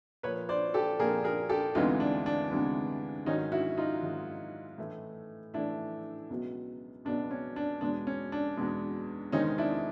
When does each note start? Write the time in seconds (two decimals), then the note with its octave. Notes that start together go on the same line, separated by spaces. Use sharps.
0.23 A#2 F3 A#3 B4 C#5
0.49 C5 D5
0.74 G4 A4
0.99 A#2 F3 A#3 G#4 A#4
1.24 G#4 A#4
1.49 G4 A4
1.75 D2 C3 E3 G#3 B3 D#4 F4
2.00 D4
2.26 D4
2.51 D2 C3 E3 G#3 B3
3.26 G#2 D#3 F#3 C#4 D#4
3.52 E4 F#4
3.77 D#4 F4
4.03 G#2 D#3 F#3
4.78 A2 E3 A3
5.54 A2 E3 A3 D4 E4
6.30 C#2 B2 F#3 B3
7.05 C#2 B2 F#3 B3 D4
7.31 C#4
7.56 D4
7.81 E2 B2 G#3 D4
8.07 C#4
8.32 D4
8.57 E2 B2 G#3
9.32 E2 C3 D#3 G#3 C4 C#4 D#4
9.58 D4 E4